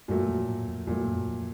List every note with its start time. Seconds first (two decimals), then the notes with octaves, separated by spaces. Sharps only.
0.08 F#2 A#2 F#3 A3
0.29 F2
0.48 A2
0.68 F2
0.87 F2 A#2 F#3 A3
1.07 F#2
1.28 F2